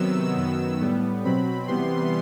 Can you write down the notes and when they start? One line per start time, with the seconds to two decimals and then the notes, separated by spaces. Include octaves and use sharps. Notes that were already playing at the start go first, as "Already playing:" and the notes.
Already playing: C3 D#3 F#3 B3 E6
0.36 F#2 D#3 F#3 B3
0.81 A2 G3 B3
1.24 B2 F#3 C4 B5
1.68 C3 E3 G3 B3 C6